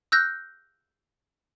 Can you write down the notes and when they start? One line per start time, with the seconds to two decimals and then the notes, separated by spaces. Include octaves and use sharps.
0.12 E6 F#6 G6 A#6